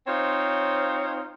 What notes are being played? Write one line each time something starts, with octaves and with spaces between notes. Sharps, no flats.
C4 D#4 F4 C5 C#5